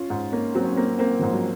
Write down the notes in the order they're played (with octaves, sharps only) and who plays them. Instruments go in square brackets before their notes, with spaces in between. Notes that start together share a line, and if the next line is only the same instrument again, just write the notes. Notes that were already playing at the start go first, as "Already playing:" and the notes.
Already playing: [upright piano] C#4 [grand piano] F4
[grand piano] G#2 [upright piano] D#4
[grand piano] A#3 [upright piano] C#4
[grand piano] F#3 [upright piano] C4
[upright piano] C#4
[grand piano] A#3 [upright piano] C4
[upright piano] C#4
[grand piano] A#3 [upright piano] C4
[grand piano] G#2 [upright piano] F3
[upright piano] F#3